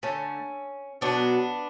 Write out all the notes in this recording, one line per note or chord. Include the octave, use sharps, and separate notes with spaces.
D3 A3 C#4
B2 F#3 A3 B3 D4